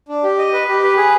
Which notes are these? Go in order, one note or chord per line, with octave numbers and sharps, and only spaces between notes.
D4
G4
D#5
B4
G4
B4
G#4